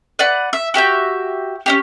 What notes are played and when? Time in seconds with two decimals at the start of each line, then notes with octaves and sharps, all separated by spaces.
0.19 B4 D5 F#5
0.53 E5
0.74 F#4 G4 E5 G6
1.66 C#4 D4 G4